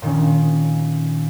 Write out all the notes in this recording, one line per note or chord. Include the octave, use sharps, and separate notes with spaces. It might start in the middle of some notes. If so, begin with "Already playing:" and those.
A#2 D#3 C#4